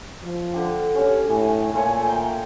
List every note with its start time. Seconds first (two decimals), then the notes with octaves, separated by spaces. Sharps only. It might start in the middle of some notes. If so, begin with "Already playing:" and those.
0.23 F3
0.54 D3 G4
0.95 C#4 G4 C#5
1.29 A2 G#5
1.74 A#2 A3 F4 C#5
2.06 G5 A#5